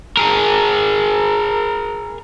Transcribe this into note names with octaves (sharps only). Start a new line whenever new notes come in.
G#4 A#4